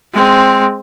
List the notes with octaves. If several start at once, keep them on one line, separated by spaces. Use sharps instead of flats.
G#3 C4